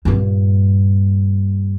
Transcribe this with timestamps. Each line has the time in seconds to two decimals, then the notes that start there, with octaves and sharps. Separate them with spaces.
0.05 G2 A#2